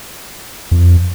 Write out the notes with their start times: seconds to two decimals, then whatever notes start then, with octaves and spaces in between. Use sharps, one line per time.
0.71 F2